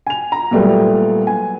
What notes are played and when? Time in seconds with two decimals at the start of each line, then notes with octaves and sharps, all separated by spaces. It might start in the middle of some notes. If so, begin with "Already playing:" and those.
0.07 G#5 F7
0.32 A#5
0.51 A#2 F#3 G3 A3 B3
1.27 G#5